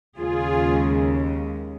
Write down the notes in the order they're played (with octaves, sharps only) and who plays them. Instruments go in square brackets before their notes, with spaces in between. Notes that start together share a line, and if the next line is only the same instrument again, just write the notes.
[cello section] D#2 C#3 G#3 F4 G#4